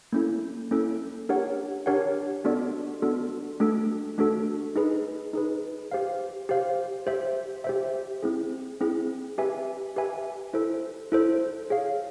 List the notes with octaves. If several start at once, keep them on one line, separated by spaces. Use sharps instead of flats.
A#3 C#4 E4 A4
A#3 C#4 E4 A4
D4 G4 A#4 C#5 F#5
D4 G4 A#4 C#5 F#5
B3 D4 F#4 A4 D5
B3 D4 F#4 A4 D5
A3 D4 F#4 A4
A3 D4 F#4 A4
D#4 G#4 B4
D#4 G#4 B4
G4 C5 F5
G4 C5 F5
G4 C5 E5
G4 C5 E5
C4 E4 G#4
C4 E4 G#4
G4 B4 E5 G#5
G4 B4 E5 G#5
E4 A4 C5
E4 A4 C5
G#4 C#5 F5